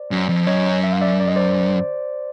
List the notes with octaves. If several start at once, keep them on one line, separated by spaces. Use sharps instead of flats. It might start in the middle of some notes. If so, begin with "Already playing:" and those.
Already playing: C5 D5
F#2
F2
F#2 C#5 D#5
E5
F5
D5 E5
D5
D#5
C5 D5